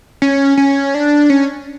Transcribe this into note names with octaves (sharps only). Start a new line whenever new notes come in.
C#4
C#4
D4
C#4